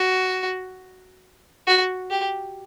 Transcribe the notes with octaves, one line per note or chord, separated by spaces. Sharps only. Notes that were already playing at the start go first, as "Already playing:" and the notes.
Already playing: F#4
F#4
G4